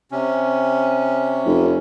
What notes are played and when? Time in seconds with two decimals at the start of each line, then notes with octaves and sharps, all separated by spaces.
0.12 C3 C#4
1.46 F1